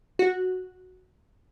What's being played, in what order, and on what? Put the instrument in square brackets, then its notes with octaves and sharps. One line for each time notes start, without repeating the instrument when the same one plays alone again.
[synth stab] F#4